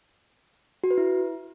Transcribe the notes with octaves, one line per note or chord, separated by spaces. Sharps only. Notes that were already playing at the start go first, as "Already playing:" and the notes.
F#4
B4
E4